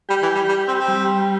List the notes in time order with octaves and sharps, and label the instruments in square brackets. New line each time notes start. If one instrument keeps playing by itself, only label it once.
[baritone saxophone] G3 [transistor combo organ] G4
[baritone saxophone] E3
G3
G3
C4
C4
[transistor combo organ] G3